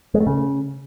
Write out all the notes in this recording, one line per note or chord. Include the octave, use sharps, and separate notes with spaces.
G#3
A3
C#3